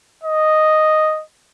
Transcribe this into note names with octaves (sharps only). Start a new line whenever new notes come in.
D#5